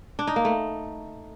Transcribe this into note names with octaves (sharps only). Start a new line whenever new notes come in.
D4
D#4
A#3
A3